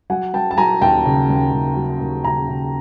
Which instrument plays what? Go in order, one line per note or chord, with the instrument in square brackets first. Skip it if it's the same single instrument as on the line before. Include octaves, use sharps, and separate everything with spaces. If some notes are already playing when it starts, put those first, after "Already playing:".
[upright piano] F#3 F#5 G#5
F#3 G5 A5
A5
F#3 G#5 A#5
D#2 G5 A5
C#3
D#2
D#2
F#3
D#2
C#3 G#5 A#5
C#3